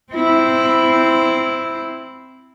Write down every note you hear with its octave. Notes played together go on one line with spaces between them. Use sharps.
C4 E4